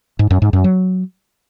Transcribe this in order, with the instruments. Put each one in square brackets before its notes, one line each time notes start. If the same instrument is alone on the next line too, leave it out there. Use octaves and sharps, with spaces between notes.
[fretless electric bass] G#2
F#2
G#2
F#2
F#3